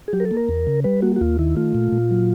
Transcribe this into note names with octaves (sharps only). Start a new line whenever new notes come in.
G#4
F#3 G4
A#4
A4
A#3
A#4
E2
C#3
G3 B4
A#3 F#4
F#4
D#2 F4
D#3 E4
A3 F4
A#2
A#2
F#3